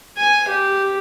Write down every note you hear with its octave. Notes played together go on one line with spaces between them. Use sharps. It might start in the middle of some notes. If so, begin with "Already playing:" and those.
G#5
G4